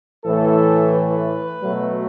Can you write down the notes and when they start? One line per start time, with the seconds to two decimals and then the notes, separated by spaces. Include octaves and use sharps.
0.24 A2 E3 A3 A4
0.93 B4
1.63 B2 F#3 A3